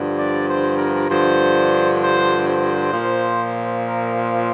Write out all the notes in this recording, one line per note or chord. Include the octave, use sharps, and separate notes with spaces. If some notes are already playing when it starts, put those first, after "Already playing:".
Already playing: G2 D3 F3
D5
C5
A#4
G2 D3 F3 C5
C5
C5
A#2 F3
A#4